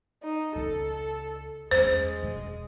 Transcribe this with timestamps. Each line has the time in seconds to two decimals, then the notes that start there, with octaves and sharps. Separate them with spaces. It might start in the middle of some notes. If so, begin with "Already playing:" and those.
0.23 D#4
0.55 C#2 C#3 A4
1.71 E2 G#3 C#4 C5
2.23 E1